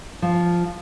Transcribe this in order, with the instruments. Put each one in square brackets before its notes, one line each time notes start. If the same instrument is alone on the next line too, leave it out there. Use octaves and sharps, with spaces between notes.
[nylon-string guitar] F3